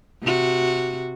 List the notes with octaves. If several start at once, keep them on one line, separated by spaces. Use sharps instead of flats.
C3 F#4